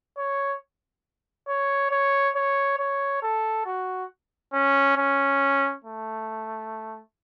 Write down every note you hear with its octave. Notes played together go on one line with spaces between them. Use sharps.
C#5
C#5
C#5
C#5
C#5
A4
F#4
C#4
C#4
A3